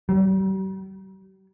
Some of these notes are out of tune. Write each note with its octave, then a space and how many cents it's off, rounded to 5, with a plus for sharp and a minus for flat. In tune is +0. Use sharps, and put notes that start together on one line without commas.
G3 -45